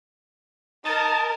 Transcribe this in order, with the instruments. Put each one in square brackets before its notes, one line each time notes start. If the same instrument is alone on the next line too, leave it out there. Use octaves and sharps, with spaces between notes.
[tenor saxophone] D#4 [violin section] A#4 [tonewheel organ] A5